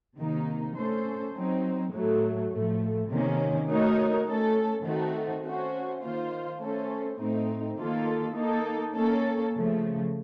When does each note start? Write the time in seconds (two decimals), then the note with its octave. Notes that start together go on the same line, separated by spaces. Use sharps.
0.17 C3 D#3 A#3 D#4
0.76 A3 C#4 A4 C5
1.34 F#3 C4 D#4
1.93 A2 F#3 A3
2.52 A2 F3 A3
3.09 C3 D#3 A#3 C#4
3.69 A3 D#4 F#4 A#4 C#5
4.27 A3 C#4 A4
4.85 D#3 A3 C4 D#4 F#4
5.43 A3 C#4 F#4 C5
6.02 D#3 A#3 F4 C5
6.61 A3 C#4 A4 C5
7.19 A2 A3 C4 D#4
7.78 D#3 A#3 F4 A4
8.36 A#3 D#4 A4
8.95 A#3 C#4 A4
9.53 C#3 F3 A3